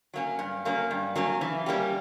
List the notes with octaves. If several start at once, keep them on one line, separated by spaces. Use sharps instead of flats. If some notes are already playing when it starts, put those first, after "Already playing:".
F#3 A#3 C#4
G2
F#3 A#3 C#4
G2
F#3 A#3 C#4
E3
G3 A#3 C#4 G4